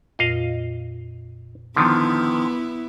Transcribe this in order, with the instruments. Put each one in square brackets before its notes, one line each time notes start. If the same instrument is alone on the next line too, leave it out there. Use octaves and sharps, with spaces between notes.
[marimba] F2 A#2 F4 [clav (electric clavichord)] D#5 F5
[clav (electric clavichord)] D3 D#3 F3 [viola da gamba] B3 E4